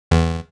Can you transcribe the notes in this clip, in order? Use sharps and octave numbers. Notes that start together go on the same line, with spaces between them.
E2